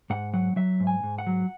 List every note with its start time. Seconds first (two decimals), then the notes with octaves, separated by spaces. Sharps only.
0.10 G#2 F#5
0.33 F#3 F#5
0.56 F#3 E5
0.80 G#2
0.87 G#5
1.03 G#2
1.18 F#5
1.27 F#3